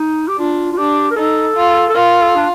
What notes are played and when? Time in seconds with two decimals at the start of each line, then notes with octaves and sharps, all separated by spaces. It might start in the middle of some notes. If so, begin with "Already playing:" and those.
Already playing: D#4
0.28 G4
0.39 D4 F4
0.73 F4
0.77 D4 G4
1.11 A#4
1.16 D#4 A4
1.56 F4
1.89 A4
1.95 F4 A#4
2.21 A4
2.36 D4